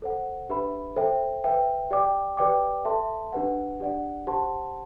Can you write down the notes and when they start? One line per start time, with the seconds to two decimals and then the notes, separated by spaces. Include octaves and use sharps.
0.02 A4 C5 F#5
0.49 D4 G4 B4 E5 B5
0.96 A4 C5 E5 G5
1.44 B4 E5 G5
1.91 G4 D5 G5 D6
2.37 G4 B4 D5 G5 D6
2.85 A4 E5 A5 C6
3.32 D4 G4 B4 F#5
3.80 D4 G4 D5 F#5
4.27 G4 C5 F#5 A5 C6